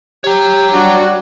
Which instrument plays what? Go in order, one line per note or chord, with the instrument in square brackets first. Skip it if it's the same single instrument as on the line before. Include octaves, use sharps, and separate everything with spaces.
[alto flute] G4 [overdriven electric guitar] C#5 A#5
[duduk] G3 [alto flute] D4 [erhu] F#4